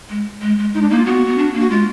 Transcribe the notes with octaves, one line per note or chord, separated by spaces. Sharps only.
G#3
G#3
G#3
G#3 D#4
D4
A#3 D#4
F4
B3 F#4
B3
D4
A#3
F#4
G#3 F4